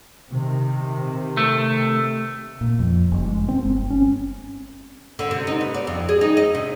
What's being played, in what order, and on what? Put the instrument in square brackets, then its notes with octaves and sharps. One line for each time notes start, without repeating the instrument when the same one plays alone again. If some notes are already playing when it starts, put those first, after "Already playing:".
[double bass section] C3 D#3
[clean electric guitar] A3
[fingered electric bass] A#2
F2
F#1
G#3
C4
G1
C#4
[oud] D3
C3
D#4
B3
D5
F2
G#4
D#4
D#5
C3